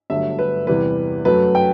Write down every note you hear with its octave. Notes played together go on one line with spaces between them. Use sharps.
G1 G2 F#3 A3 E5
B4
E2 C3 E3 G3 B4
F#2 F#3 A3 B4
G5